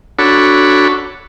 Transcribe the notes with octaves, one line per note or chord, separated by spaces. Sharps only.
D4 F#4 A4 C#5 B5